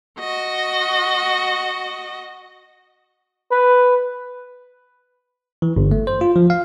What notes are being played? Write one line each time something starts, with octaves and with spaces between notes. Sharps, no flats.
F#4 D#5
B4
E3
G1
A3
C5
F4
F3
F5